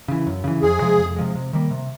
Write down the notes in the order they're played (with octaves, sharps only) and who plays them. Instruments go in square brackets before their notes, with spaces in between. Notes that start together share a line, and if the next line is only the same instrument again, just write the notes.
[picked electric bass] C#3 E3
F#2
C#3 E3
[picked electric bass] F2 [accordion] G#4
[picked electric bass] C3 F3 G#3
F2
C3 F3 G#3
C3
D#3 G3 A#3
C3